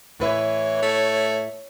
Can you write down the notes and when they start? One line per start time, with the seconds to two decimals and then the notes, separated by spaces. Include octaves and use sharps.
0.20 A2 E3 B4 C#5 E5
0.82 A3